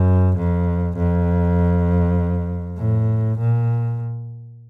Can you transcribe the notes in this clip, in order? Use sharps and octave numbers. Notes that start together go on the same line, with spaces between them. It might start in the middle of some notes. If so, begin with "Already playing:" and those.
Already playing: F#2
F2
F2
A2
A#2